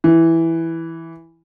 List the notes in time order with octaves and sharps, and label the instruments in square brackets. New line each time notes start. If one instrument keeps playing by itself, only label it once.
[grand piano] E3